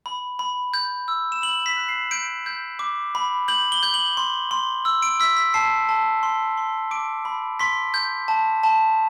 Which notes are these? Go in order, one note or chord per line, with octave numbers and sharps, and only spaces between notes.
B5
B5
G6
E6
E7
B5 F#7
B6
F#6
C7
G6 D7
G6
D6
B5
G6 F#7
G7
G6
F#7
C6
C6
E6
D7
E6 B6
B6
A5 C7
A5
C6
C6
D6 D7
B5
C6 B6
G6
A5
A5